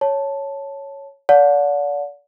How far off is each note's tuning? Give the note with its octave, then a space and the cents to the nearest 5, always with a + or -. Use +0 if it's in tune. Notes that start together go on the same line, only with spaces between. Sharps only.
C#5 +0 A5 +0
D5 -35 F#5 -35 A5 +0